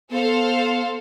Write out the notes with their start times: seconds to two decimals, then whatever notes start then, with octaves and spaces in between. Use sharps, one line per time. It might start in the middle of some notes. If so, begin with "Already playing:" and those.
0.10 B3 A4 C5 F5